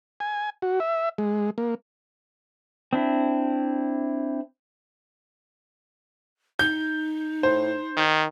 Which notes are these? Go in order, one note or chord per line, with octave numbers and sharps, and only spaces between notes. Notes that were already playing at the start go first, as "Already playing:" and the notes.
G#5
F#4
E5
G#3
A#3
C4 D4 E4
D#4 G6
A2 C5
D#3